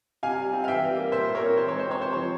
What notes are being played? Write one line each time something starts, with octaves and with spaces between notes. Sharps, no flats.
C3 F5 G#5
G3
C4
F5
E3 E5 G5
G3
A#3
A#2 C5 E5
G3
A#4 C#5
C4
E3 C5
G#3 C#5
C5
C4 C#5
C3 C5
F3 C#5